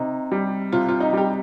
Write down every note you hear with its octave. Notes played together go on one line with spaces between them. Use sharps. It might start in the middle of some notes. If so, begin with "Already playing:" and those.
Already playing: C3 D#4
G3
C3 F4
F4
D#4
G3 G4